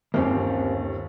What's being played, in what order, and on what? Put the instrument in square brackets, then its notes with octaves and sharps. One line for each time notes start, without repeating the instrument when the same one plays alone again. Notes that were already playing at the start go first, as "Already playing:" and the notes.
[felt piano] G1 D#2 [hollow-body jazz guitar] A#3 C4 C#4